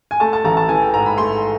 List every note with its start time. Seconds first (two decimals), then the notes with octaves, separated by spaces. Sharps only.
0.11 G#5
0.20 A3 A5
0.33 A5
0.44 A1 A#5
0.57 A5
0.69 E3 G#5
0.82 G5
0.94 G#2 A#5
1.06 B5
1.18 A3 C6